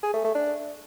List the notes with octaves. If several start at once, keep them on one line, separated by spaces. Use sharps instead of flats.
G#4
A3
A3
D4